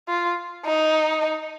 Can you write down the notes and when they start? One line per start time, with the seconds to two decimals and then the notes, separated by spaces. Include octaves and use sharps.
0.08 F4
0.65 D#4